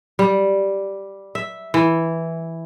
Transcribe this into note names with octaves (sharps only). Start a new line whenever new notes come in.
G3
E5
E3